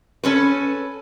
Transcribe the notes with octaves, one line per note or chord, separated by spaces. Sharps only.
C#4 A4 B4